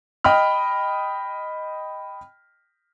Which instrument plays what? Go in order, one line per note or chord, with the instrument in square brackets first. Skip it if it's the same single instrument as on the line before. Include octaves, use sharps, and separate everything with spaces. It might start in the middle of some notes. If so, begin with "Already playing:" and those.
[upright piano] D#5 G5 B5 F6